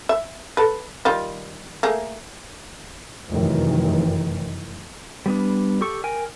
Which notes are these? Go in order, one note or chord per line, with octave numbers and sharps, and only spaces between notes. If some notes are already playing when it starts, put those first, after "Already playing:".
E5
A4 B4
D#3 G3 F4
A3 A#3 G#4
F1 F#2 D#3 E3
G3 B3 D4
G4 A4 C#6
A#4 G5 G#5